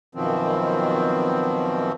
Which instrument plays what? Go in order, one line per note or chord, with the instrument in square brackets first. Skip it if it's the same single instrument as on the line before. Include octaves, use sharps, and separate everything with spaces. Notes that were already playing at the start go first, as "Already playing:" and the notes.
[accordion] F#2 B2 D#3 F3 C4